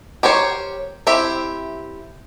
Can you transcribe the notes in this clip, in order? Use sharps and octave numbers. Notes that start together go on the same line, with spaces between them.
G4 A#4 C5 C#5
C4 E4 G4 E5